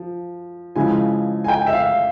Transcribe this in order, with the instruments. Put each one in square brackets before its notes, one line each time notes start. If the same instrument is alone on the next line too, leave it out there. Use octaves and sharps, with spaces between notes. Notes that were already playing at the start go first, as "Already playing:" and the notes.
Already playing: [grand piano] F3
C#3 F3 G#3 E4 G#5
G#5
G5
E5
F5